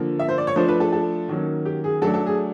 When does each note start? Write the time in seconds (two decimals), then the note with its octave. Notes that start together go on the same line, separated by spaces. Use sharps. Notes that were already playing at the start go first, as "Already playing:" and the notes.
Already playing: D3 F3 A#3
0.19 E5
0.29 C5
0.38 D5
0.47 C#5
0.56 F3 A3 D4 C5
0.68 B4
0.80 A4
0.92 A4
1.29 D#3 F#3 A#3 C#4
1.65 G4
1.84 G#4
2.02 F#3 A3 D4 A4
2.14 A4
2.26 G#4